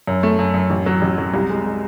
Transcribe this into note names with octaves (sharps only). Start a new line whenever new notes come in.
F#2
A3
F#2
F#2
A1
F#3
A1
F#3
C2
G#3
G#3